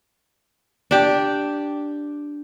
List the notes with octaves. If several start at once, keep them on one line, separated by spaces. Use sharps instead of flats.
D4 G4